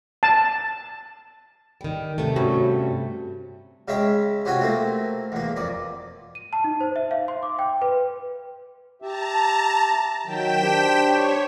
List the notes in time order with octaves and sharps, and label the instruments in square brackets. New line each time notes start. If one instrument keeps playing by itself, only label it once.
[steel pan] A5
[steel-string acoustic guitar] D#3 G3
C3 A3
[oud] G2 C#4 F#4
[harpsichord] C#3 G#3 C#4 E5 G5
C3 C#4 F4 F#4 G5 G#5
A3 A#3 C4
E2 A#3
F2 D5
[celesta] D#7
A5
D#4
C5
E5
F5
C6
D6
G5
B4
[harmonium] G4 E5 [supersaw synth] A5 A#5
[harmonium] D#3 F#3 [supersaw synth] G5 B6 E7
[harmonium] D4 G4 C5
[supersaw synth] C#5